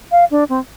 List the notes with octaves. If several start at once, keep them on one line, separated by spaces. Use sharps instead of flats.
F5
D4
C4